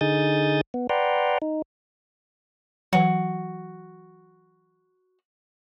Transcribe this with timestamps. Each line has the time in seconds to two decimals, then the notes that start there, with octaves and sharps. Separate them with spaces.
0.01 D3 D#4 G#4 D#6 G6 A6
0.74 B3
0.90 B4 D5 F#5 G5 A#5 C6
1.42 D#4
2.93 E3 F#3 F#4